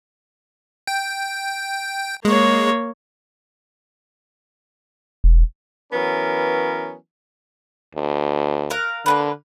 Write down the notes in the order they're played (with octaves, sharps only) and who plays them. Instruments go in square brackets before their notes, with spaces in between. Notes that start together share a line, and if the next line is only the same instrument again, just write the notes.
[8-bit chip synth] G5
[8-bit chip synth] G#3 [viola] A#3 C#5
[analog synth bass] E1
[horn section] E3 F#3 B3 C#4 A#4
[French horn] D2
[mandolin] A#4 F5 F#6
[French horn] D3 [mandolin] A#3 B3 B4